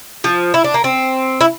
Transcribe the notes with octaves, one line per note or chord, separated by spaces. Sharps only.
F3
E4
D4
A#3
C4
E4